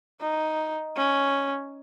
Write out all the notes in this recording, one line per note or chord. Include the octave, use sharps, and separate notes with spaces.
D#4
C#4